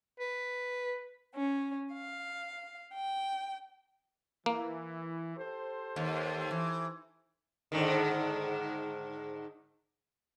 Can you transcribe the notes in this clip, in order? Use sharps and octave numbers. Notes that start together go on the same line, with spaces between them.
B4
C#4
F5
G5
E3 A#3
G4 A4 C5
D#2
E3
G#2 D3 D#3